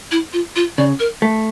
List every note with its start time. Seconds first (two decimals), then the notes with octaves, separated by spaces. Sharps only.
0.12 E4
0.33 F4
0.56 F4
0.78 C#3 D5
1.00 A#4
1.22 A3